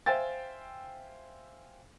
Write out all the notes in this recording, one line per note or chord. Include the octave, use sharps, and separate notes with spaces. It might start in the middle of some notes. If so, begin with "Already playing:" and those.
C5 E5 F5 G5 G#5 A6